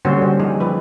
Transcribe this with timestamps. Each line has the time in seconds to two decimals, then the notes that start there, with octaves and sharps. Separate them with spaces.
0.05 D3 G3 A#3 C#4 F#4 C5
0.22 G3
0.40 F3 D#4 G#4
0.60 F3 B4